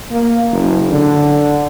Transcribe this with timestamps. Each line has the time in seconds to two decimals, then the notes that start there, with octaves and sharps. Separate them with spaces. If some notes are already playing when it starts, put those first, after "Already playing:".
0.11 A#3
0.51 F#1
0.91 D3